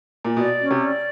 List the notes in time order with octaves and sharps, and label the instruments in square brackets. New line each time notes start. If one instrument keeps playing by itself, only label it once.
[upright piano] A#2
[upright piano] B2 [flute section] D5
[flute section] C#4
[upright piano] C3
[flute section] D5